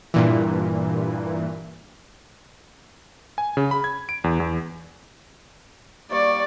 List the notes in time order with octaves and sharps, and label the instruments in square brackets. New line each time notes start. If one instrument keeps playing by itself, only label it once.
[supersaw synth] G2 A#2 E3
[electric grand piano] G#5
C#3
B5
G#6
D7
E2
E2
[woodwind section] G3 A#3 C#6 [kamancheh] D5